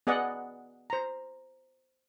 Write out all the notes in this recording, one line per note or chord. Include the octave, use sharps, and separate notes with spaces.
B3 G#4 D5 D#5 F#5
C5 A#5